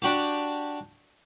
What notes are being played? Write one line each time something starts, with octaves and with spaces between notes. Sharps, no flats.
D4 F#4 G4